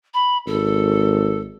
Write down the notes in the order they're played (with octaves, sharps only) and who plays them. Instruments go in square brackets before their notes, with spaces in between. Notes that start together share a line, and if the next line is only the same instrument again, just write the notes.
[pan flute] B5
[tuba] G#1 [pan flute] A4